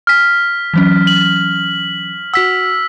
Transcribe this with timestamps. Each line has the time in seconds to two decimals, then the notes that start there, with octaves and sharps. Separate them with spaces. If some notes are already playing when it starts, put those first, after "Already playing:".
0.07 F6 B6
0.74 E3 F#3 C#4
1.07 F#7
2.34 F#4 F#5 E6 B6